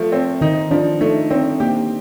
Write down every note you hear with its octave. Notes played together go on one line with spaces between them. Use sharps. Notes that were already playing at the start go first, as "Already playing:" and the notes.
Already playing: F3 A3
C4
D#3 D#4
F3 D4
A3 D#4
C4 D4
A#3 G4